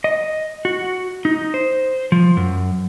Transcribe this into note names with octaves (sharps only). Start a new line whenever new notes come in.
D#5
F#4
D#4
C5
F3
F#2